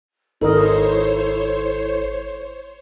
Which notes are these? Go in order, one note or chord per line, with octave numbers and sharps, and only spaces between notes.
G#1 D#4 E4 A4 A#4 C5 C#5 D#5